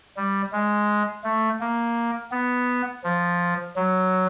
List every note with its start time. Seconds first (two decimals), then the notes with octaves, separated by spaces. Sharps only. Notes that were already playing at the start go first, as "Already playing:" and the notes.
0.17 G3
0.52 G#3
1.24 A3
1.61 A#3
2.32 B3
3.04 F3
3.76 F#3